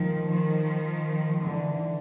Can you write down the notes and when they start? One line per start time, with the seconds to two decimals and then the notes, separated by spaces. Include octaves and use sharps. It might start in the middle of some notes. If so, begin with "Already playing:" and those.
Already playing: D#3 F3
0.29 D#3 F3
1.43 D3 E3